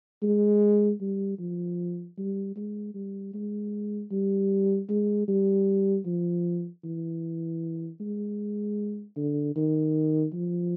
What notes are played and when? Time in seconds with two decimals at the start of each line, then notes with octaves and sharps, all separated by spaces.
0.22 G#3
1.00 G3
1.39 F3
2.17 G3
2.56 G#3
2.94 G3
3.34 G#3
4.11 G3
4.89 G#3
5.28 G3
6.06 F3
6.84 E3
8.00 G#3
9.16 D3
9.56 D#3
10.33 F3